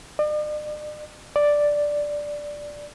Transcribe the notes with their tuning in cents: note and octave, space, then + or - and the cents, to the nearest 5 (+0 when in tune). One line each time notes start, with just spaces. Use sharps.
D5 +45
D5 +0